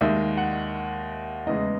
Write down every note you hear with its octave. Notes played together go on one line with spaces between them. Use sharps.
D#2 D#3 G#3 E5
F#5
E2 C#3 E3 G#3 D#5